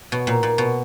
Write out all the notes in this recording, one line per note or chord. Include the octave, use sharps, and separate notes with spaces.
B2
A#2
A#2
B2